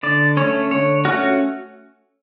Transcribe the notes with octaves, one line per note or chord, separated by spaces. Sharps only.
D3 D5
A3 C#4 C#5
D3 C#5
A3 C#4 F#4